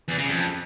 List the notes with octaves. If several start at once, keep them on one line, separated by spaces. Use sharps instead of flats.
E2
C#3
F2